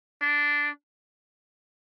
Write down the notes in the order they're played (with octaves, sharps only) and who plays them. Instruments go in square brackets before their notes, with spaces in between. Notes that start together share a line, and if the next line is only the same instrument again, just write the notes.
[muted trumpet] D4